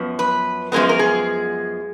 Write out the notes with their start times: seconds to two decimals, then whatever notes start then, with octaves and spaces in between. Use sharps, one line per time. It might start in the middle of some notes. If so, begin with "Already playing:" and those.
Already playing: F#2 F3 B3
0.19 B4
0.72 F#2 F3 G#3 B3 A#4
0.89 A#4
0.99 G#4